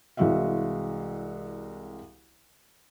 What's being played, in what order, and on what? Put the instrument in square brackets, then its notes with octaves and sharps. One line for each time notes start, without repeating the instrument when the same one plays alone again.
[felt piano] C2 E3 G#3 F#4 E5 F5